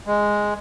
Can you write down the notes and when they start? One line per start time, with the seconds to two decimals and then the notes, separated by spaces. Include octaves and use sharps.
0.07 G#3